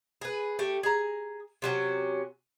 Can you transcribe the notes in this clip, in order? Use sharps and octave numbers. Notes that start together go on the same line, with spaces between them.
G#4 B4
A3 G4
G#4 A#5
C3 F#3 C#4